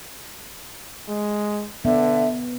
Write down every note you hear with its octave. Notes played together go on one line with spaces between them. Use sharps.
G#3
D3 B3 E5